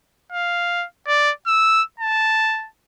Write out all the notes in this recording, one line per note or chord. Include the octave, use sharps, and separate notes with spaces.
F5
D5
E6
A5